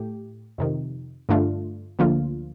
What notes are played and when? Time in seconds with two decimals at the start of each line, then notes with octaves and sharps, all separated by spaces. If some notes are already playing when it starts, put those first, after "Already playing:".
Already playing: A2 A3 G4
0.58 F2 C3 D#3
1.29 G2 D3 A3 D4 F4
1.99 D2 D3 F3 A#3 F4